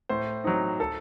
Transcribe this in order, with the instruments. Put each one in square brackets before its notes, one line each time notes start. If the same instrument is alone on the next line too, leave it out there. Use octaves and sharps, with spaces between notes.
[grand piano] A2 C5
F#3 C4 D#4
A4